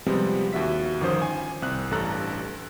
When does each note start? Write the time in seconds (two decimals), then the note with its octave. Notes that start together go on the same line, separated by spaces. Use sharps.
0.06 C3 F3 G3 G#3 B3 C4
0.53 D#2 F#4 E5 B6
1.01 G1 D#3 F3 C#4 C5 D#6
1.22 G#5
1.62 C2 C4 F#6
1.91 A1 G2 A4 A#5 F#6